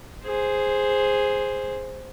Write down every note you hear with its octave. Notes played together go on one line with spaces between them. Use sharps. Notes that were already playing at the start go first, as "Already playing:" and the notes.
G#4 C5